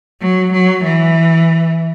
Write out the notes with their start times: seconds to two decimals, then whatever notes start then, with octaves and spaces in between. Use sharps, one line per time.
0.21 F#3
0.52 F#3
0.84 E3